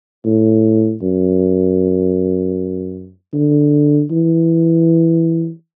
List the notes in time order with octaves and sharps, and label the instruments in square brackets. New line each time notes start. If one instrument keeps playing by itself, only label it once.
[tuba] A2
F#2
D3
E3